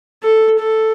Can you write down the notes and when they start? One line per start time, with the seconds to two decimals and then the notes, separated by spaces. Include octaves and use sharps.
0.24 A4
0.59 A4